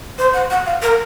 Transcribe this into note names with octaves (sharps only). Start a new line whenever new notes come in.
C5
F#5
F#5
F5
A#4